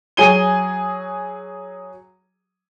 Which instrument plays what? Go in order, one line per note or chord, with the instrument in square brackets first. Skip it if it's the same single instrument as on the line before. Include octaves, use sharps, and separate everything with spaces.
[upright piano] F#3 G#4 D#7 G7